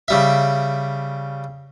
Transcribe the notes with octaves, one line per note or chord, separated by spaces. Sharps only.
C#3 G3 E5